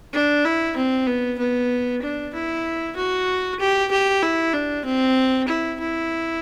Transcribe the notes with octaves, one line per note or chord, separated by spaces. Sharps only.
D4
E4
C4
B3
B3
D4
E4
F#4
G4
G4
E4
D4
C4
E4
E4